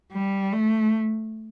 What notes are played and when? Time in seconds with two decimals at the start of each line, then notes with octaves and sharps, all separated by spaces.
0.12 G3
0.53 A3